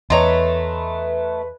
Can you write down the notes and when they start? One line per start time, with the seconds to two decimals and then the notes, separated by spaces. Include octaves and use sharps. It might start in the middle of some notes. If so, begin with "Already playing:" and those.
0.10 E2 A3 B4 C#5 D#5 A#5 C6